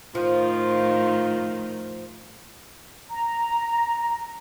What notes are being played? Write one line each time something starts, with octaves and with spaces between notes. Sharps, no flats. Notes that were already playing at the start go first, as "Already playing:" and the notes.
A2 D#3 F3 F4
A#5